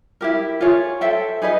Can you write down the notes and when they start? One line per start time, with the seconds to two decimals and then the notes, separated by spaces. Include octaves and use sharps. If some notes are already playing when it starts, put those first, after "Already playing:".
0.21 E4 G4 A#4
0.61 F4 G#4 C#5
1.01 A4 C5 E5 G5
1.42 D#4 G#4 B4 D#5